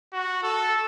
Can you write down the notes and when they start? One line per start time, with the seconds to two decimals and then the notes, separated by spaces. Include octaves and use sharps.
0.13 F#4
0.43 A4